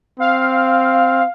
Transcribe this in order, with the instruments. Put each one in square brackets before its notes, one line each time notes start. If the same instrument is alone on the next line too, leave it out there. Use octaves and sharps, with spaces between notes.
[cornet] C4 [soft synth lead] F5